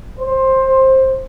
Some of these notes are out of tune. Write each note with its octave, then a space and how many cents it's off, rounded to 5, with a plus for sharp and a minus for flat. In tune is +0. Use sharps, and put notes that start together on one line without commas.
C5 +15